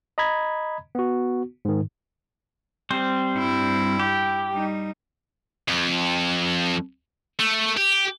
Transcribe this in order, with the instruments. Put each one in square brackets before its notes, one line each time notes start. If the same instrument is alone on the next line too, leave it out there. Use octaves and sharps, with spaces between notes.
[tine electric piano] D#5 A#5 B5 G#6
B3 F#4
G#2 D#3
[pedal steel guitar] G3 C4 C5
[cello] G2 E4
[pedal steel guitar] G4
[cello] G3 D#4
[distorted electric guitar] F2
A3
G4